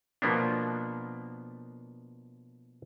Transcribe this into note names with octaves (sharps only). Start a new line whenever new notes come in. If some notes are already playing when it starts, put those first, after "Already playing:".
B2 F3 A#3 B3 D4